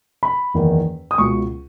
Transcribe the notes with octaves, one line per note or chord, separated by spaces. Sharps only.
B5
F#1 E2 D#3
D#6
C#2 B2 C#6